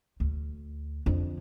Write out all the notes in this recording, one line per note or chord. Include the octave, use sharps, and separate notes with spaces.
D2
F2 D3